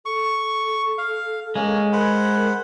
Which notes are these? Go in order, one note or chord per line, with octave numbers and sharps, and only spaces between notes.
A4 C#6
F5
G#3 A#3 C#4
A#4 C5 F#5 B5